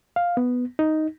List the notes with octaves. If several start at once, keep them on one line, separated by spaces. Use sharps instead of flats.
F5
B3
D#4